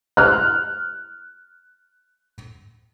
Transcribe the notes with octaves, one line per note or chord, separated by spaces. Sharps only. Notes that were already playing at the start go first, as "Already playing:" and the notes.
F6 F#6